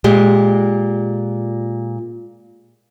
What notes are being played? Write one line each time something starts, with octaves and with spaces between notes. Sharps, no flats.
A#2 G#3 G4